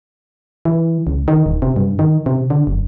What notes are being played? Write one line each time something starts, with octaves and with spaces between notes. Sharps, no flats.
E3
C#2
D#3
D#1
C3
G2
D#3
C3
D3
F#1